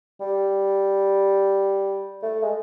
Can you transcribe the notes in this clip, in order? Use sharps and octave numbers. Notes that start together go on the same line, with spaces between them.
G3
A3
G#3